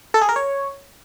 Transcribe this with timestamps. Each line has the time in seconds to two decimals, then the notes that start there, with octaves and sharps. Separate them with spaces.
0.14 A4
0.21 G#4
0.29 A#4
0.36 C#5